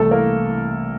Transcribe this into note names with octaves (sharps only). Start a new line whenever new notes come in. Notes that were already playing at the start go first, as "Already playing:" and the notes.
Already playing: C2 C3 E3 A3 A4
A#3 A#4